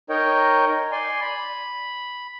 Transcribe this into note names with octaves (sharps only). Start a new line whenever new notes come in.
D#4 A#4 C#5 D#5 G5
D5 G#5 C6
B5